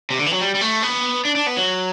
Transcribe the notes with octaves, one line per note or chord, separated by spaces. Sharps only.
C3
D3
E3
F#3
G3
G3
A3
B3
D4
D4
B3
F#3